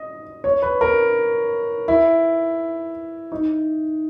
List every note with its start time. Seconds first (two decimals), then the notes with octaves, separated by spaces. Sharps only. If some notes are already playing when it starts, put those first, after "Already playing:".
Already playing: D#5
0.44 C#5
0.62 B4
0.81 A#4
1.88 E4
3.32 D#4